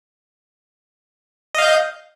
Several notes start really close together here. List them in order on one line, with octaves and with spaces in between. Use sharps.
D#5 F5 G6